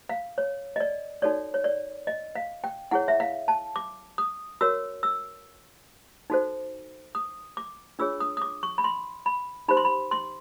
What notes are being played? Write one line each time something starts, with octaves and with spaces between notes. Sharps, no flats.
F5
C#5
D#5
D5
D#4 F#4 A4 C#5 D5
C#5
D5
D#5
F5
G5
E4 G#4 C#5 F#5
E5
F5
A5
D6
D#6
F#4 A#4 C#5 E6
E6
D#4 F#4 A4 C5
D#6
D6
D4 F4 G#4 C#5 E6
D#6
D#6
D6
C#6
B5
C6
B5
D#4 G4 C5 B5
C6
B5
C6